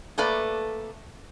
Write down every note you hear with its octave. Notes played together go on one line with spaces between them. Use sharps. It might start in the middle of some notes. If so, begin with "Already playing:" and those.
A3 A#3 A4 B4 D5